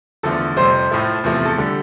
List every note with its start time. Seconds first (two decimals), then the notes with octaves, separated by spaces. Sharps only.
0.23 E2 D3 F3 A3 A4
0.56 F2 C3 G3 C5
0.91 A2 F3 A3
1.24 E2 C3 F3 A3
1.45 A4
1.58 D3 G3